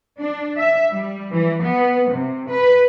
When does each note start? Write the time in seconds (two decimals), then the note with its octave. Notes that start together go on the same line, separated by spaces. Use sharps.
0.18 D4
0.57 E5
0.92 G3
1.32 E3
1.63 B3
2.11 C3
2.49 B4